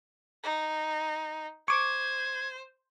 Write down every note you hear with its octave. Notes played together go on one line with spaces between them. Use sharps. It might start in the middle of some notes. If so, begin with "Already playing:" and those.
D#4
C5 C#6 D6 G#6